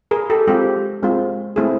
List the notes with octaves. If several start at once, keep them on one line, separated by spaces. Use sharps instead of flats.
G#4 A#4
G4 A4
G#3 C4 F4 G4
G#3 C4 F4
A3 C4 E4 G#4